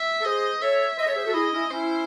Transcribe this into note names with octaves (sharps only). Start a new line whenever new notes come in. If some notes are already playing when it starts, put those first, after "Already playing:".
Already playing: E5
A4
G#4 C5 D#5
A4 C#5 E5
C5 D#5
A4 C#5
G#4 C5
F#4 A4
E4 G#4 D#5
C#4 E4
C#4 E4 C5